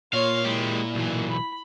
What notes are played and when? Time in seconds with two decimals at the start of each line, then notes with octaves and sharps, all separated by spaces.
0.13 A#2 F4 C#5 F5
0.45 G#3 E4 G4
0.95 B1 E3
1.30 B5